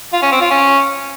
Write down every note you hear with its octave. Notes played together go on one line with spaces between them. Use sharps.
F4
C#4
C4
F4
C#4